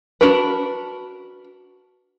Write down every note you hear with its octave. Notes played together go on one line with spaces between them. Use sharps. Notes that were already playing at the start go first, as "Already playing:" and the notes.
D4 F#4 A#4 B4